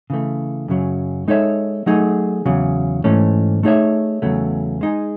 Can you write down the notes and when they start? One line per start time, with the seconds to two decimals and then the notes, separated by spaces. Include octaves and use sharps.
0.10 C#3 E3 A3
0.68 F#2 C#3 F#3
1.28 G#3 D#4 A4 C#5 E5
1.86 F#3 A3 D#4 G#4
2.46 E2 C#3 F#3
3.04 G#2 E3 A3 C#4
3.63 A3 D#4 G#4 C#5 E5
4.22 E2 C#3 F#3 A3
4.81 G#3 D#4 G#4